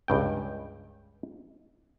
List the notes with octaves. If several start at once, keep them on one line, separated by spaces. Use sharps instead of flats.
C#2 G2 G5